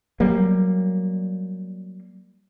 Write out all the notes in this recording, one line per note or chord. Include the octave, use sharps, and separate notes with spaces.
F#3 G3 A#3